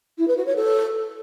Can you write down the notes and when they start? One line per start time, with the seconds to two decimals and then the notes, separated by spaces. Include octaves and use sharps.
0.18 E4
0.28 B4
0.37 F#4
0.46 C#5
0.56 A4